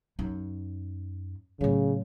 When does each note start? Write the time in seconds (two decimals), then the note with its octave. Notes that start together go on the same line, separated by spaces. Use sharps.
0.19 F#2 D#4
1.61 A2 C#3 F#3